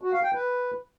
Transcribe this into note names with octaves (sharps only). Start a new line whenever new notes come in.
F#4
F5
G5
B4